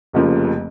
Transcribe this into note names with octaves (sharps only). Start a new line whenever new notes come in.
F1 F2 C#3 F3 A#3